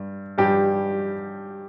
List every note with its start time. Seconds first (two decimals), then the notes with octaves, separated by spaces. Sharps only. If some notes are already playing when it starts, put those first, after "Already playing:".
Already playing: G2
0.38 G2 G3 G4